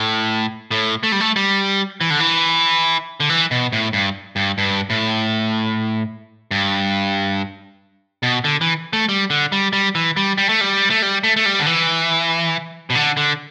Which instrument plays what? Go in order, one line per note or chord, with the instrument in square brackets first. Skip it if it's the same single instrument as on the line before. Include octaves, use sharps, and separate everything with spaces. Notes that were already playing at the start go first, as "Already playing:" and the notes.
Already playing: [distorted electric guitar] A2
A2
A3
G3
A3
G3
E3
D3
E3
D3
E3
B2
A2
G2
G2
G2
A2
G2
B2
D3
E3
A3
G3
D3
G3
G3
E3
G3
G3
A3
G3
A3
G3
A3
A3
G3
D3
E3
B2
D3
D3